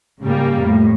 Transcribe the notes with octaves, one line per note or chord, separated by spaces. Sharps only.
G#2 C#3 G3 A#3
F2 A2